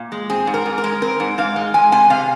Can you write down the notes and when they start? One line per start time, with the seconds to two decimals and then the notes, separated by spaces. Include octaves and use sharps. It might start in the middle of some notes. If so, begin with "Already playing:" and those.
Already playing: A#2
0.12 G#3
0.30 C4 G#4
0.47 G#2
0.54 A#4
0.66 G#2
0.78 A#4
0.84 G#3
1.02 C4 A#4
1.20 G#2
1.38 G#2 F5
1.56 G#3
1.74 G#3 G#5
1.92 C3 G#5
2.10 C3 F5